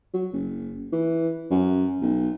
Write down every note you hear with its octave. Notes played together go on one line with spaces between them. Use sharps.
F#3
F#1
E3
F#2
B1